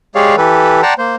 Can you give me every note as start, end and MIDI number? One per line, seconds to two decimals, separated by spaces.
0.15 0.36 56
0.15 0.36 67
0.15 0.36 68
0.15 0.36 73
0.15 0.36 74
0.15 0.36 77
0.37 0.81 52
0.37 0.81 67
0.37 0.81 69
0.37 0.81 71
0.83 0.94 74
0.83 0.94 78
0.83 0.94 79
0.83 0.94 81
0.83 0.94 82
0.83 0.94 84
0.98 1.16 58
0.98 1.16 72